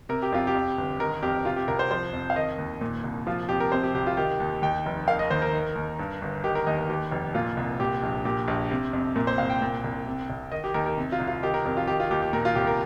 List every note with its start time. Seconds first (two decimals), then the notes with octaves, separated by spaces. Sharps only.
0.09 C3 A#4
0.22 G4
0.32 F2 F4
0.47 G4
0.55 F2
0.78 G1
1.00 D#3 A#4
1.23 F2 G4
1.45 C3 F4
1.56 G4
1.68 C2 A#4
1.79 C5
1.91 F3 C5
2.13 F2
2.30 F5
2.36 D#3 D#5
2.58 D#2
2.81 A#2
3.04 C2
3.27 F3 F4
3.49 F2 G4
3.60 A#4
3.71 C3 C5
3.83 G4
3.94 C2 G4
4.06 F4
4.17 D#3 G4
4.40 D#2
4.62 D#2 G5
4.86 F1
5.08 D#3 F5
5.19 D#5
5.30 D#2 C5
5.42 A#4
5.53 D#3
5.76 D#2
5.99 G2
6.22 G1
6.44 D#3 G4
6.55 A#4
6.67 D#2 D#5
6.78 A#4
6.89 D#2 G4
7.11 F1
7.35 A#2 F4
7.57 C2
7.80 A#2 G4
8.03 A#1
8.25 A#2 G4
8.48 A#1
8.71 C3
8.93 F2
9.16 A#2 A#4
9.27 C5
9.38 C2 F5
9.50 G5
9.62 A#2
9.84 C2
10.07 C3
10.30 C2
10.52 D#3 D#5
10.64 G4
10.74 D#2 A#4
10.86 A#4
10.98 C3
11.12 F4
11.20 C2
11.27 F4
11.43 D#3 G4
11.54 A#4
11.65 F2 A#4
11.77 F4
11.88 D#3 G4
12.00 F4
12.11 D#2 G4
12.22 G4
12.33 A#2 A#4
12.45 F4
12.55 C2 G4
12.67 A#4